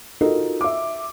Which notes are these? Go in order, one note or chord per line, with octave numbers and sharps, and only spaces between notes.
D#4 F4 F#4 A4 A#4 D#5
E5 D6